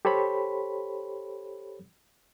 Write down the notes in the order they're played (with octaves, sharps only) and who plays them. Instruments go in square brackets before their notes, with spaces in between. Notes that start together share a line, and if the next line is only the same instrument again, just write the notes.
[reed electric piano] G4 A4 C5 C#5 B5